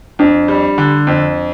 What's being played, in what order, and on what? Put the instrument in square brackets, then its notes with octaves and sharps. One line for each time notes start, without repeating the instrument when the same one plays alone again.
[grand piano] F2 [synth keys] D4
[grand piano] G3
D3
F2